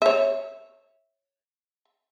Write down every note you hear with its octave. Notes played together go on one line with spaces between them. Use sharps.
C#5 E5